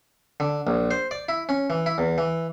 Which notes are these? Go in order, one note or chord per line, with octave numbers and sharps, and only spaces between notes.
D3
A#1
C5
D5
E4
C#4
E3
E4
E2
E3